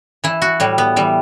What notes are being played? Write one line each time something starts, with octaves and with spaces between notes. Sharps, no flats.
E3 E4
F#4
A2 G3
B3
E3 G3